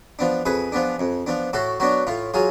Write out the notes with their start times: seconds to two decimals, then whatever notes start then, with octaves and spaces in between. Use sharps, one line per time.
0.19 F3 B3 D4
0.45 F2 G#4 B4
0.72 F3 B3 D4
1.00 F2
1.27 F3 B3 D4
1.53 A2 F#4 A4
1.80 F#3 B3 D4 F#4
2.07 A2 F4
2.34 F#3 F4 G#4